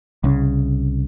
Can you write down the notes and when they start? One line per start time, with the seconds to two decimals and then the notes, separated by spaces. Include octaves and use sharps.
0.24 C2 C#3